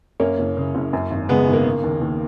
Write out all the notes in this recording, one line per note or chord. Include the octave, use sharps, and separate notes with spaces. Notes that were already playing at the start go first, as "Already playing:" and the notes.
F#2 A#3 C#4
F#1
C#3
F#1
F#2
G#1
C#3 G#3 B3
G#1
A#3
C#3
D#2
D#2